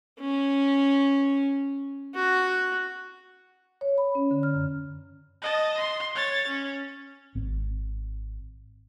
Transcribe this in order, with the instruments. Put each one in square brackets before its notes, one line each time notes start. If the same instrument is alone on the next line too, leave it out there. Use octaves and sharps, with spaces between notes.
[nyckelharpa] C#4
F#4
[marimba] C#5
B5
C#4
D3
F6
F#2
[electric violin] D#5 A5
C6
C#5 A6
C#4
[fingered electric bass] G#1 C4